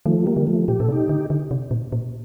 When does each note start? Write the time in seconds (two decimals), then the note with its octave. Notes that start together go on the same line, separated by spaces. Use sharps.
0.06 D#3 F3 A3
0.26 G3 A#3
0.36 D3
0.47 F3 A3
0.68 A#2 G4
0.80 A#2 A4
0.88 C3
0.92 D#4 G4
1.09 D3
1.30 D3
1.51 C3
1.71 A#2
1.92 A#2